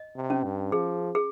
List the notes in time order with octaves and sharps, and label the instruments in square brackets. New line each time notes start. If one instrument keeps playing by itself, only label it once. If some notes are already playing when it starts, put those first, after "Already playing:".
Already playing: [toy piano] D#5
[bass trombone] C3
[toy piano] C#4
[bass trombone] G2
[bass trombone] F3 [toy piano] G#4
[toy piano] G#4